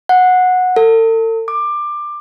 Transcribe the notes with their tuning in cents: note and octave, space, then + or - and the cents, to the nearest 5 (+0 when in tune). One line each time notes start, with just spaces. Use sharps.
F#5 -15
A4 +45
D6 +20